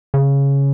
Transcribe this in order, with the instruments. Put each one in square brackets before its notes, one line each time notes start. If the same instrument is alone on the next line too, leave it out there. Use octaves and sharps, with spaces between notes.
[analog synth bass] C#3